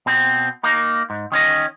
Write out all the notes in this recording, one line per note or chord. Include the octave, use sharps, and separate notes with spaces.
B2 C4
A#3 D#4
G#2
D#3 C#4 D#5